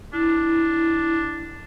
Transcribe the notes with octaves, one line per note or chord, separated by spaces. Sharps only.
D4 E4